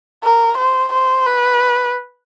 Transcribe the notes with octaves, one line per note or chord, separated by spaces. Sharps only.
A#4
C5
C5
B4